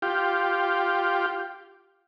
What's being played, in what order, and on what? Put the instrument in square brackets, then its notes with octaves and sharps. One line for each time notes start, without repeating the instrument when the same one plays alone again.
[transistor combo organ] F4 G4